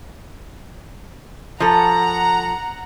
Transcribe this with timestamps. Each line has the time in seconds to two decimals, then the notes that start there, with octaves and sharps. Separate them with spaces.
1.60 F3 A4 F#5 A#5